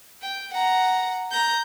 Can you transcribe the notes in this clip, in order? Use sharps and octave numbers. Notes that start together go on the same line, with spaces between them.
G5
F#5 A#5
A#5 G6